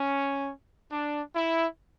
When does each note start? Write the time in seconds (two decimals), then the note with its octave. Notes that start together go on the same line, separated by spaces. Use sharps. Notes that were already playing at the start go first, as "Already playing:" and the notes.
Already playing: C#4
0.91 D4
1.35 E4